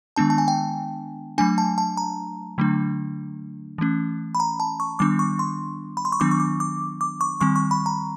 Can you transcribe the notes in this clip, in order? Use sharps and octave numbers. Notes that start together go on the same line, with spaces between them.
D#3 G#3 B3 D4 A5
A5
G#5
G5
F#3 A3 D4 G#5
A5
A5
A#5
D3 F#3 A3 D4
E3 A3 C#4
B5
A#5
A5
C#6
D#3 G3 B3 D4 D6
C#6
C6
B5
C6
C#6
D#3 F#3 B3 D4 D6
C#6
D6
D6
D6
C#6
D#3 G3 C4 C#6
C#6
B5
A#5